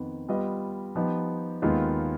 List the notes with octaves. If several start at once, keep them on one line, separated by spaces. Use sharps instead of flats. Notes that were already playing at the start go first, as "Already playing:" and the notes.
Already playing: F2 D#3 B3
G3 B3 F4 B4 D#5
F3 B3 D#4 G4
D#2 D#3 G#3 B3 F4